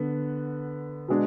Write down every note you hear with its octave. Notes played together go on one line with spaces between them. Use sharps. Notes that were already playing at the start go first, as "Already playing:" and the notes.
Already playing: D3 B3
B2 G#3 D4